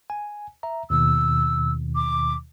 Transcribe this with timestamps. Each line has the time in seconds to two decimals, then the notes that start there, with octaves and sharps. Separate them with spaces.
0.10 G#5
0.63 E5 A#5
0.90 D#2 B2 D#3 E6
1.95 D6